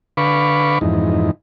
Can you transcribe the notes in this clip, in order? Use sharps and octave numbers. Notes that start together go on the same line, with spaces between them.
D3 B4 F5 B5 C#6 D6
F2 G#2 E3 D#4